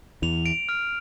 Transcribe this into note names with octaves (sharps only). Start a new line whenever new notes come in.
E2 E3 F7
D7
F6